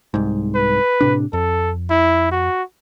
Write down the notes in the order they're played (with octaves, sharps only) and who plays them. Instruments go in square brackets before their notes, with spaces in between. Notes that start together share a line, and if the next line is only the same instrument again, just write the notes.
[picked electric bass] C2 G#2
[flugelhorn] B4
[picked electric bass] A2 C3 D4
[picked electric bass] F2 [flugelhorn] A4
[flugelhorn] E4
F#4